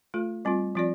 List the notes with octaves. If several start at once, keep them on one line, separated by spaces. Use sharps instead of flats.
A3 F4 A4
G3 C4 F4
F3 C4 F4 D5